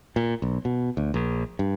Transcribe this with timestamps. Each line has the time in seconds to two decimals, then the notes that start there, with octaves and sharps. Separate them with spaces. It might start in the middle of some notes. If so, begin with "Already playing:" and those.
0.16 A#2
0.42 B1
0.65 B2
0.97 D2
1.14 A#1
1.59 G2